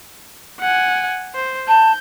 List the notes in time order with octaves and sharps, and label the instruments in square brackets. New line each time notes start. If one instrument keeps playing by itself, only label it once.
[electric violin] F#5 G#5
C5
[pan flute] A5 [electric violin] G6